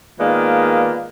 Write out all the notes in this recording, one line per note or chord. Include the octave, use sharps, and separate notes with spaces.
D#3 G#3 A#3 B3 F4 D5